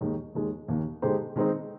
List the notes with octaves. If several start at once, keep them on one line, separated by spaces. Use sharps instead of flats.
D#2 D#3 G#3 D#4
D#2 D#3 G#3
D#2 D#3 A#3
D3 G#3 D#4 G4 C5
D#3 G#3 C4 D#4